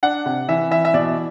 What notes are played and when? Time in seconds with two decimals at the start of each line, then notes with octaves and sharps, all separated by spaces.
0.03 D4 F#5
0.26 C3
0.48 E3 E5
0.71 E3 E5
0.85 E5
0.94 B2 D5